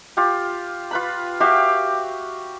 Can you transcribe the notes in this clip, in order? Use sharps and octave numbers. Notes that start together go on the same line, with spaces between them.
F4 G4
F4 B4 B5
F#4 G4 E5 F5